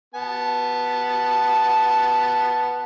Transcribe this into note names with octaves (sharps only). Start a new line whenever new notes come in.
B3 A5